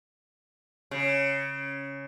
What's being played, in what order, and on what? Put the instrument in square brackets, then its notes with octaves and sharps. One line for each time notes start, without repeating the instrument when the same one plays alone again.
[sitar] C#3